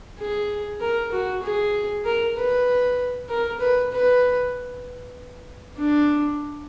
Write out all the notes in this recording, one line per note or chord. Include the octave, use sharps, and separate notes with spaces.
G#4
A#4
F#4
G#4
A#4
B4
A#4
B4
B4
D4